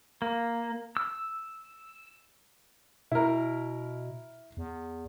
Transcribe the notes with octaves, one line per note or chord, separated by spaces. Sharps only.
A#3
E6
B2 E4 A#4
E2